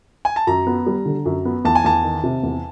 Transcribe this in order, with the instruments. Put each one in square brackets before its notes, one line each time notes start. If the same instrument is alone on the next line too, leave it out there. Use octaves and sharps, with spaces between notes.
[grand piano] G#5
A5
[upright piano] F#2 [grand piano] A#5
[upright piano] B3
G3
D3
F#2
B3
[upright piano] E2 [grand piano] A5
[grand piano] G#5
[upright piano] E2 [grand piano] A5
[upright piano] D#3
C3
E2